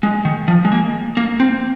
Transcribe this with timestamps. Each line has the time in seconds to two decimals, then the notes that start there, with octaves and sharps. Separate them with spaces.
0.03 G#3
0.25 D#3
0.48 F3
0.65 G#3
0.72 A#3
1.17 A#3
1.40 C4